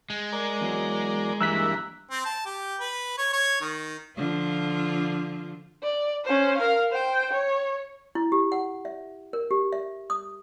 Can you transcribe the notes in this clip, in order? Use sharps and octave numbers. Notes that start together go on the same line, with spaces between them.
G#3
A#4 D5
E2 F#3
G2 E3 G3 A#3 A#4 E6 F#6 B6
C4
A5
G4
B4
C#5
C#5
D#3
D3 F3 F4
D5
C#4 C5
A#4 F5
C5 G5
C#5
E4
G4
F#5
E5
A#4
G4
E5
D#6